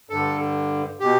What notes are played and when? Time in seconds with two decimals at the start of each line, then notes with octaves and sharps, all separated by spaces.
0.10 G2 D3 A4
1.00 B2 G4